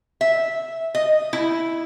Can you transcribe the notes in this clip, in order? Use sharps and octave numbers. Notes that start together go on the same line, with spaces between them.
E5
D#5
E4